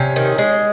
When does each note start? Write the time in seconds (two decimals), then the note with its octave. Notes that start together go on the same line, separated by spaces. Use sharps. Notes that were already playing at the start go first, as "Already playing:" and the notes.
Already playing: C3 C#4
0.16 D#3
0.38 G#3